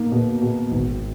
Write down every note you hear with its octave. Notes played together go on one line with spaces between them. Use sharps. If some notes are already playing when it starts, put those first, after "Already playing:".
Already playing: B2 A#3 D#4
B2
B2
G#1